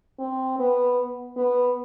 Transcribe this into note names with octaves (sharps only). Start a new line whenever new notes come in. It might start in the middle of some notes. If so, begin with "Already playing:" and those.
C4
B3
B3